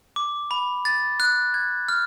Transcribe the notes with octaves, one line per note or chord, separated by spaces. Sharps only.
D6
B5
A6
F#6
G#6
F6